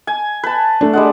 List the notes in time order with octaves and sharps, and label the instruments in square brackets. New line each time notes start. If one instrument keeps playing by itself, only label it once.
[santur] G#5
B4 A5
[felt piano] A3 D4
[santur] G3 G#3 F#5